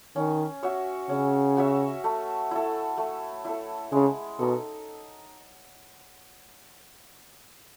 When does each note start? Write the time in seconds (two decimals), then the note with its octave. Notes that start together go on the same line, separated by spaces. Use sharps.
0.16 D#3 C#4
0.63 F#4 C#5 E5
1.09 C#3 C#4
1.57 F#4 C#5 E5
2.04 A3
2.51 E4 A4
2.98 A3
3.45 E4 A4
3.92 C#3 G#3
4.39 B2 D#4 A4